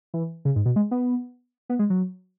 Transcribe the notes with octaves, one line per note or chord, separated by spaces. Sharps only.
E3
C#3
G#2
B2
G#3
B3
B3
G#3
F#3